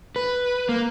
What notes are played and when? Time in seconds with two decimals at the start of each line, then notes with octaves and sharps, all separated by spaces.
0.16 B4
0.69 A#3